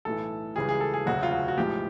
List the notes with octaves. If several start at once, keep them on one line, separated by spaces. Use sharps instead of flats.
B1 A2 E3 A4
C#2 C#3 E3 G3 G#4
G#4
A4
G#4
E1 D2 C#3 F#3 F#4
F4
F#4
F#4
B1 A2 F3 G#3 G4